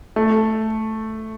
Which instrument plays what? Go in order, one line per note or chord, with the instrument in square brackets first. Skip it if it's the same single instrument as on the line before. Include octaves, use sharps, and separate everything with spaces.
[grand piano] A3